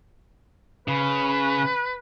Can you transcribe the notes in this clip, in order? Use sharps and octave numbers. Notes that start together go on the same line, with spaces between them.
C#3 B4